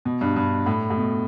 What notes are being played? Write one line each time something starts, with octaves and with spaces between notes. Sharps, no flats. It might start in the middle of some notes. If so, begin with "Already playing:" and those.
B2
G2
G2
A2
A2
B2